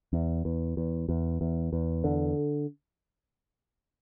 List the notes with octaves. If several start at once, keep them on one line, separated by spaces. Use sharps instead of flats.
E2
E2
E2
E2
E2
E2
D3